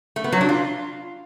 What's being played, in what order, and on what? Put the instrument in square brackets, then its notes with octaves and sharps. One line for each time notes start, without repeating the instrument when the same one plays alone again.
[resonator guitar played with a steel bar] A3
B3
F#3
D4
F4